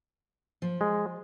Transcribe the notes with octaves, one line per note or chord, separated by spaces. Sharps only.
F3
G#3